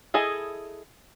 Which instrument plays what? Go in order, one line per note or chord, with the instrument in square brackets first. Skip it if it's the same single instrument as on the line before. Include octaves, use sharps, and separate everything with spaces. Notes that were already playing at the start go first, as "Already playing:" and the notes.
[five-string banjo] E4 G#4 A4 D#5